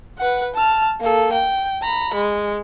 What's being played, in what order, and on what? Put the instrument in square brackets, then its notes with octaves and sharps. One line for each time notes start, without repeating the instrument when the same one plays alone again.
[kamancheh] B4 F#5
A5 F6
A#3 A4
G5
A#5 B5
G#3